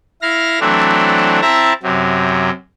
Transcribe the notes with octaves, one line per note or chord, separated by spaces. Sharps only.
E4 F5 F6 A#6
E3 F#3 A3 C4 D4
C4 E4 E5 A5 A#5
F#2 C3 F#3